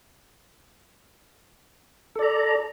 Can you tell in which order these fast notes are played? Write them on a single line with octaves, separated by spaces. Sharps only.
A4 D5 A#5